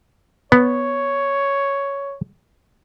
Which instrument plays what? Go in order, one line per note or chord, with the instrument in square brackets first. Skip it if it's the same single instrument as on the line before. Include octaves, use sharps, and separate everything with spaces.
[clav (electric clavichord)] B3 [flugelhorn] C#5